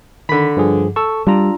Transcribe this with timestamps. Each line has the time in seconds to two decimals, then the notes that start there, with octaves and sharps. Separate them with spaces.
0.29 D3 D#3 B5 B6
0.57 G2 F3 G#4
0.96 A4 A5 C#6 E6
1.27 G3 D4 F4 A#5